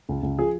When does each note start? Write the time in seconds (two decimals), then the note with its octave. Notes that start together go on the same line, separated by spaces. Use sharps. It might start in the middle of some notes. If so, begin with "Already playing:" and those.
0.09 C#2
0.23 C#2
0.39 F3 G#4